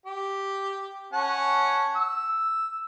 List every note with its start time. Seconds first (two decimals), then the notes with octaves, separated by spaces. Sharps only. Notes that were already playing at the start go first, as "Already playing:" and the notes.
0.06 G4
1.13 C#4 F#5 A5
1.96 E6